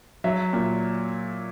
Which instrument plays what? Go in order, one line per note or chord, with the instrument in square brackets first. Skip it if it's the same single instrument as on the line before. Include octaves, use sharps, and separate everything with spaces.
[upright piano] F#3 E5
A#2